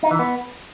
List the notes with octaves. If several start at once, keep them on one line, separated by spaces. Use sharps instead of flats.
D#4
E3
B3